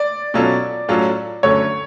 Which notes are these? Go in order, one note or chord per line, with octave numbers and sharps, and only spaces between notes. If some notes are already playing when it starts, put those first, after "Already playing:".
Already playing: D5
B2 F#3 C#4 F4 A4
A2 F#3 C#4 F4 A4
D2 D3 F#3 A3 C#4 C#5